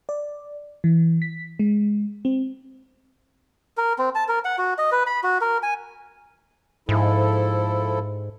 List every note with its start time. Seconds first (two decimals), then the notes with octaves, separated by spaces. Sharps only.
0.09 D5
0.84 E3
1.22 B6
1.59 G#3
2.25 C4
3.77 A#4
3.98 C4
4.15 A5
4.28 A#4
4.45 F#5
4.58 F#4
4.78 D#5
4.92 B4
5.07 B5
5.23 F#4
5.41 A#4
5.63 G#5
6.89 G#2 F3 E4 A4